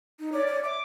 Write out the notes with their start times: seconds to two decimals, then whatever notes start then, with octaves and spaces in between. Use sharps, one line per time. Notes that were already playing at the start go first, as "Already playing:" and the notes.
0.19 D#4
0.32 C#5 D5
0.47 C#5
0.64 E5 D6